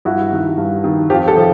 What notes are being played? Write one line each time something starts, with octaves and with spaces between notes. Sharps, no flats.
G2 E4 F#4
D#3
G2
D#3
F2 F4 G4
G4 A4
C3 F3